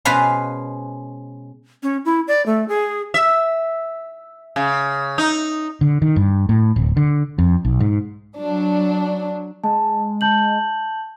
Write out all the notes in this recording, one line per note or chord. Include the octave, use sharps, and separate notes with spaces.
B2 G#3 C#4 B4 C5 F5
C#4
E4
D5
A3
G#4
E5
C#3
D#4
D3
D#3
G2
A2
D1
D3
F2
B1
G#2
F#3 D4
G#3 A5
A5 G6 F#7